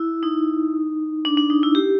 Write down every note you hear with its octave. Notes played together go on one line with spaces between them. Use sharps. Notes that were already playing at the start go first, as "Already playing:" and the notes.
Already playing: E4
D#4
D4
D4
D#4
E4
G4